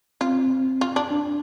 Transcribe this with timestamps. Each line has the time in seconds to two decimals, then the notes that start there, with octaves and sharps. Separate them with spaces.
0.21 C4 F4
0.81 F4
0.96 D4
1.11 D4